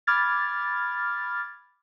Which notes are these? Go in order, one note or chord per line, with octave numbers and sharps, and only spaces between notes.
B5 D6 F6 G#6 A6